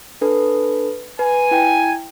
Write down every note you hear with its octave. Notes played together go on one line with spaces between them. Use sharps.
D4 A4 B4
B4 G#5
E4 G5